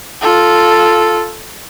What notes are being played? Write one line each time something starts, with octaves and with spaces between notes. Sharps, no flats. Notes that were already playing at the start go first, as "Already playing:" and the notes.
F4 A4